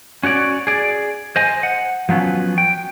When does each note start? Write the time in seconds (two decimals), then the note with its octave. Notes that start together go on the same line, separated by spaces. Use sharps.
0.23 C#4 F#4 C#5 D5
0.67 G#4 D5
1.36 C5 D#5 G#5
1.63 F#5
2.09 F3 F#3 B3 C#4
2.58 G5